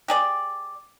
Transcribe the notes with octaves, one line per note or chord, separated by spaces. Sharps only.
G4 G#4 D5